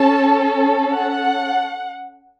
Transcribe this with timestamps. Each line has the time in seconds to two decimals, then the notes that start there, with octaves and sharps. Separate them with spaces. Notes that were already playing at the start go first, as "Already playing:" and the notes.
Already playing: C#4 A4 A5
0.92 F#5